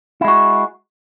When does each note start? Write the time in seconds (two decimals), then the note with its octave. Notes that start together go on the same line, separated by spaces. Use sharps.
0.21 E4
0.24 G#3
0.28 F#4